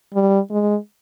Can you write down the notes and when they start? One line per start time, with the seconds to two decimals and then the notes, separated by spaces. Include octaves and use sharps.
0.14 G3
0.51 G#3